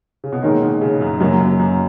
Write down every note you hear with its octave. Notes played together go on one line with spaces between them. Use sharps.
C#3
B2
A#2 D#3 G#3 D#4 A#4 C#5
B2
C#3
F#2
F#2 C#3 F#3 A#3
F#2
F#2